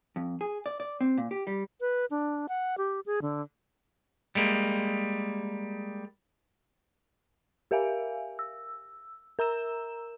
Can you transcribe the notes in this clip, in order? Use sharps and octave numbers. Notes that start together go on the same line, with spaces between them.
F2
G#4
D5
D5
C4
A#2
G4
G3
B4
D4
F#5
G4
G#4
D3
G3 G#3 A#3
G4 A#4 E5 F5 G#5
E6
A#4 A#5 E6 E7